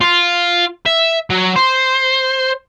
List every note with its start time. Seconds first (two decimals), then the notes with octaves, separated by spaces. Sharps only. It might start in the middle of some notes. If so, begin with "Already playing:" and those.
0.01 F4
0.86 E5
1.30 F#3
1.56 C5